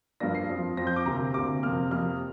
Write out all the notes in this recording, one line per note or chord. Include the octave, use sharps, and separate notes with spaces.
G2 F3 A#3 D4 A#6
C7
F2 F3 C4
F2 F3 C4 A#6
G6
D6
D2 C3 A#3 A#5
D2 C3 A#3 D6
F2 C3 A#3 F6
F2 C3 A#3 F6